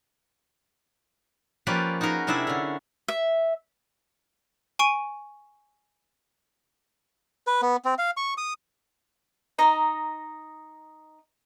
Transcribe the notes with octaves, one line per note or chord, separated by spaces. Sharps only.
F3 A#3 C#4 G4 B4 D5
D#4 F#4 G#4 A#4 B4
C3 D4 E4 G#4 D5 E5
D3 C#4
E5
G#5 C#6 D7 D#7
B4
B3
C4
F5
C#6
D#6
D#4 D#5 A#5